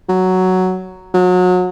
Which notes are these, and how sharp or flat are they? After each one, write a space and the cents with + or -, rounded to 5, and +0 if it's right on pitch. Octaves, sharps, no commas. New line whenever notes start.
F#3 +5
F#3 -30